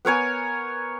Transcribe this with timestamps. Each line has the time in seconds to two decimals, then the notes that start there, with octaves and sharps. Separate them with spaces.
0.05 B3 A#4 C#5 G#5